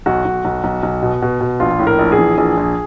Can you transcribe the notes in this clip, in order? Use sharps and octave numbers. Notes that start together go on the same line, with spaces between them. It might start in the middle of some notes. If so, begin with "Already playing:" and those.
B1 F#4
B1
B1
B1
B1
B2
B2
B2
A#1 F4
A2
A#4
A#1
G#4
E3
A#1 G#4
A#1